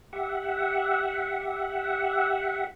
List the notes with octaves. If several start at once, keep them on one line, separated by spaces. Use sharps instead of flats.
G4 E5 F#5